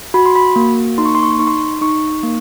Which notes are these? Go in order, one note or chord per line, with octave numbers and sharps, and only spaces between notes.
F#4 B5
C6
B5
A#3
D#4 C6
C#6
C6
C#6
C6
D#4 C#6
C6
D#4 C#6
A#3